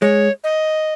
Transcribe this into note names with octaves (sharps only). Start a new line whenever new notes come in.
G#3 C#5
D#5